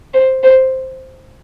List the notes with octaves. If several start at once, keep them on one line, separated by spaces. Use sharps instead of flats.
C5
C5